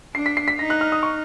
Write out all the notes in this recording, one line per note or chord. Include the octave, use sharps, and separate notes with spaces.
D4 C7
B6
C7
B6
D#4 A#6
F#6
F6
D#6
C#6